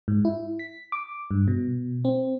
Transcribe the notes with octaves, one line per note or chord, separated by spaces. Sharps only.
G#2
E4
B6
D6
G2
B2
C4